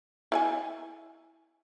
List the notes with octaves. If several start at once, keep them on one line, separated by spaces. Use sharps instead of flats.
E4 F#5 G#5